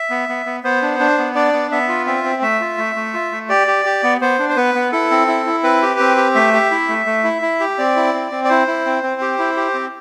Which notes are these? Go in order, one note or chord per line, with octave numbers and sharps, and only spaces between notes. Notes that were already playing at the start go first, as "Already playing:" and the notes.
Already playing: E5
B3
B3
B3
B3 C5
D4
D4
B3
D4 D5
B3
B3 E5
F4
C4 E5
C4
A3 E5
F4
A3
A3
F4
A3
G4 D5
G4
G4
B3
B3 C5
D4
C5
B3 B4
B3
E4 A4
C4
E4
E4
C4 B4
G4
C4
G4
A3 E5
G4
E4
A3
A3
E4
E4
G4
C4 D5
E4
C4
C4
D5
E4 C5
E4
C4
C4
G4
E4
G4
C4